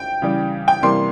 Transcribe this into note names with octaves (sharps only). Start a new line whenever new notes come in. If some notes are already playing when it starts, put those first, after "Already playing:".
Already playing: G5
C#3 E3 G3
G5
C3 E3 G3 A#3 C6